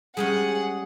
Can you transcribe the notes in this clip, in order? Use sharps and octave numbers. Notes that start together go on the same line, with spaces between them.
G3 G#3 C#4 G#4 F#5